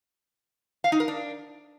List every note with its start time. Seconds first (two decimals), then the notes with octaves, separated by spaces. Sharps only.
0.84 F5
0.92 D#4
1.00 A#4
1.08 D4